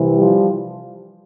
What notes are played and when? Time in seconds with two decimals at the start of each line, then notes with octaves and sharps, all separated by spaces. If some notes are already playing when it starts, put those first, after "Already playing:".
Already playing: C2 C3 E3
0.17 F3 G3